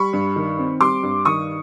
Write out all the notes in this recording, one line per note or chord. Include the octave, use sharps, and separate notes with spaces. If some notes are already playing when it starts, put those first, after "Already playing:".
Already playing: G3 B5 C#6
G2
D#3
C4
G3 C6 D6
G2
D#3 C#6 D#6